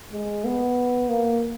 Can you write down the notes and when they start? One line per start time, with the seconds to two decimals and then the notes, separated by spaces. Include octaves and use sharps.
0.12 G#3
0.45 B3
1.09 A#3